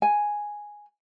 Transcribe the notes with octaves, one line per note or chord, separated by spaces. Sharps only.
G#5